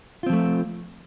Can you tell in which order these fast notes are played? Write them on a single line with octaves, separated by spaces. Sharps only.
F4 C4 F3 A3